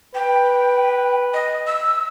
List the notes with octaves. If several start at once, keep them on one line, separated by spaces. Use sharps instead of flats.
B4 G5
D#5
E6